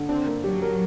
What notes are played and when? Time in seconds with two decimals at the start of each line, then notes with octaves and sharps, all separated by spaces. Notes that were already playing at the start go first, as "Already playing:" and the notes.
Already playing: D3
0.09 C4 D4
0.26 A#3
0.44 F#3 G4
0.62 A#4